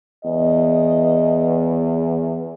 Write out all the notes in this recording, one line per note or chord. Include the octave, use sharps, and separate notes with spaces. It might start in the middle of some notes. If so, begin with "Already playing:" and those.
E2 D#5